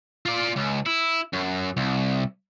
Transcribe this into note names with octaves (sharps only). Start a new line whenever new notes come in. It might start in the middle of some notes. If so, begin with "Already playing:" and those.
F4 D5
C#2
E4
F#2
C2